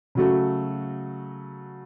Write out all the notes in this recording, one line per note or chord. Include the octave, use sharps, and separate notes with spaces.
C#3 F#3 A3 F#4